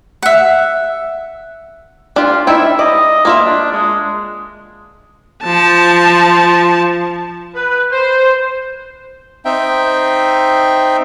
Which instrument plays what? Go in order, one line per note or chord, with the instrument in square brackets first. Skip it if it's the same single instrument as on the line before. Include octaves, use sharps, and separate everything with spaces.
[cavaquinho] E5 F#5
[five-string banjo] D4 G4 [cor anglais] F4
[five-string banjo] D#4 E4 G5 [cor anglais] E5
[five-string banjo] D5 [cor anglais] D#5
[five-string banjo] A#3 F4 E5
[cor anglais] D4
G#3
[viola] F3 A5
[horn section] B4
C5
[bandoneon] C4 D#4 E5 G5